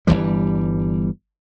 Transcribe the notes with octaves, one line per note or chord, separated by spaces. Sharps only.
G1 D#2 E3 G3